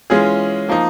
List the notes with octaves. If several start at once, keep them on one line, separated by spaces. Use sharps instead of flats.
E3 G#3 C#4 F4 G#4
F3 A#3 D#4